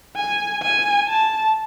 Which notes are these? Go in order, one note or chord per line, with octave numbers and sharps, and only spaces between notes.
G#5
G#5
A5